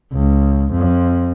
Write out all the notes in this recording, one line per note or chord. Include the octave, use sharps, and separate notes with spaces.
C#2
F2